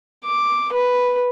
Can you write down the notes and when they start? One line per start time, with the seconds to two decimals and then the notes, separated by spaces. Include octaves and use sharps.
0.24 D6
0.73 B4